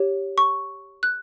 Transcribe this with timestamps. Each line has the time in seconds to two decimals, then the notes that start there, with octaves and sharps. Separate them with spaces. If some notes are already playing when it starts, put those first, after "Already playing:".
Already playing: G4 C#5
0.38 C#6
1.03 F#6